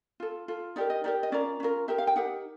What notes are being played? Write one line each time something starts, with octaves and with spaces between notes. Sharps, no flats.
F4 A4
F4 A4
D#4 G4 A#4 D5
D#5
D#4 G4 A#4 D5
D#5
C#4 F4 A#4 D5
C#4 F4 A#4
D#4 G4 A#4 E5
F5
G5
D#4 G4 A#4 F#5